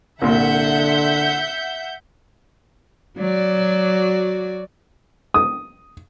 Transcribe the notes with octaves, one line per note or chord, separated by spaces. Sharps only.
C2 A#2 D3 E5 F#5 G6
F#3 F#4 D5
D#6